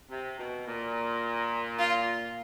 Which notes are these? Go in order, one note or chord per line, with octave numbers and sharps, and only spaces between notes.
C3
B2
A#2
F4